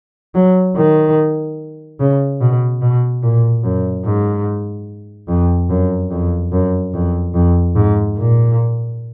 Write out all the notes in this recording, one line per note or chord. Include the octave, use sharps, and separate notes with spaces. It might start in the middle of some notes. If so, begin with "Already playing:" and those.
F#3
D#3
C#3
B2
B2
A#2
F#2
G#2
F2
F#2
F2
F#2
F2
F2
G#2
A#2